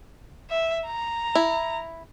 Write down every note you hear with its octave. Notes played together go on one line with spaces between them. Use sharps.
E5
A#5
E4